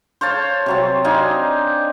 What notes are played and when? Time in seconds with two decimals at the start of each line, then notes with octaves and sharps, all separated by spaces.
0.21 C5 C#5 F5 A5
0.66 C3 F#3 C4
1.04 D4 D#4 F5 G#5